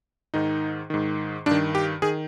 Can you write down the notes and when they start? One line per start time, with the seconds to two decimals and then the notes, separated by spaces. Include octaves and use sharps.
0.34 G#2 D#3 D#4
0.90 G#2 D#3
1.46 G2 D#3 D4
1.75 G4
2.02 D#3 G#4